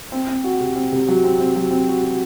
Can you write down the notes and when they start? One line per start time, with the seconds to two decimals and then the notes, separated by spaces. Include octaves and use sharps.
0.12 C4
0.29 C4
0.44 F#4
0.60 C3
0.76 C4
0.92 C3
1.08 F#3
1.24 C4
1.40 C4
1.56 F#3
1.71 C4
1.88 F#4
2.03 F#4